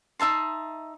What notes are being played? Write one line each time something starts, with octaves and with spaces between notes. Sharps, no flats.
D#4 E5 A5 C6